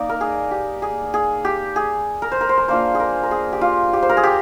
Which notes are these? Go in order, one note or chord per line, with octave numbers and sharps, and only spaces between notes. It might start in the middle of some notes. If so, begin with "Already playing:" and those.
Already playing: A#3 D#4 D5
A#4
G#4
G4
G#4
G#4
G4
G#4
A#4
C5
A#4
C5
A#4
A#3 D4 F4 C5
G#4
A#4
A#4
G#4
G4
F4
G4
C5
A#4
G#4
G4